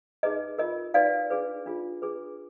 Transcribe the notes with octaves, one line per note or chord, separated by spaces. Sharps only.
D#4 G#4 B4 D#5
F4 A#4 D#5
D#4 F#4 B4 D5 F5
D4 G#4 B4
D4 F4 G#4
D4 G#4 B4